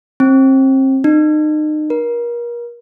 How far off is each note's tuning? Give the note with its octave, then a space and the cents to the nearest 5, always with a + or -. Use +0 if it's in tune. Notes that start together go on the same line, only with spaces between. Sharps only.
C4 +35
D#4 -30
A#4 +35